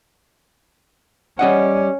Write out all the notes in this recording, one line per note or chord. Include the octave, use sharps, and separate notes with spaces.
G3 C#4 D#5 F#5